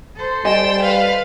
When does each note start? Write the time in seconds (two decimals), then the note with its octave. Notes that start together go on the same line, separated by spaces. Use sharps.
0.16 A4 C5
0.45 G3 D#5 G5 G#5 C6 E7
0.82 B4 F5